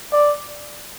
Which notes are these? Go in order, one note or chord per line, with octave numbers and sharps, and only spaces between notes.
D5